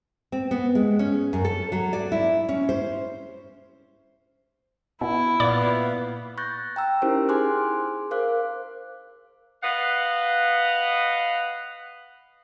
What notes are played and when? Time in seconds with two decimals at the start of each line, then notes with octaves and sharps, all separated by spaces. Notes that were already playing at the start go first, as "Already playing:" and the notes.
0.32 C4
0.51 B3
0.75 G#3
0.99 C#4
1.33 F#2
1.45 A4
1.72 F#3
1.93 D5
2.12 E4
2.49 C#4
2.69 C5
5.01 B2 E4
5.40 A#2 B3 B4 D5 F5
6.38 C#6 F#6 G6 A6 A#6
6.76 G5 A#5 E6
7.02 C#4 D#4 E4 G4 A#4 C5
7.29 G#4 G#5 C6 D6 F6 F#6
8.11 A#4 C5 F5 D6 F#6
9.63 B4 D#5 F5 F#5